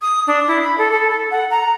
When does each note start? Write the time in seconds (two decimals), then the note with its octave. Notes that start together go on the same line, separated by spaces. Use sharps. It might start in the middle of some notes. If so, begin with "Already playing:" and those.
0.01 D#6
0.27 D4
0.47 E4
0.63 B5
0.78 A4
0.91 A4
1.10 A4
1.30 F#5
1.50 A#5